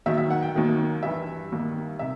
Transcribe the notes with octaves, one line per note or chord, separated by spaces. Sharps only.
D#2 D#3 F#3 E5
E5
F#5
G5
D#2 D#3 F#3
G2 E3 G3 E5
D#2 D#3 G3
C3 E5